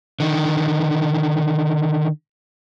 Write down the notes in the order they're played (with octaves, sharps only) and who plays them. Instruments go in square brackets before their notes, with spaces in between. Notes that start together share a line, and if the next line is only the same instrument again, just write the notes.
[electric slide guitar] D3 D#3